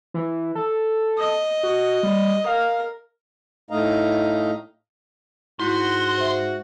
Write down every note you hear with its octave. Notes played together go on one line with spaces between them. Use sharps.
E3
A4
D#5
F#4
G3
A#4 F5
A2 A3 D#4 D#5 F5 A#5
G#2 E4 F#4 C6 G6 B6
C5 E5